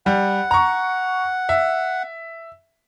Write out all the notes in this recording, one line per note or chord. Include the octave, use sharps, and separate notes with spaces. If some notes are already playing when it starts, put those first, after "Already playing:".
G3 F#5
A#5 C#6
E5